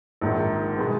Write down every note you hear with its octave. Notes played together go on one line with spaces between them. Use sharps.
A#1 G#2 D#3
B2 G#3 B3